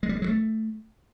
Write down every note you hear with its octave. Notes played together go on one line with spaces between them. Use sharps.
G#3
G3
G#3
F#3
A3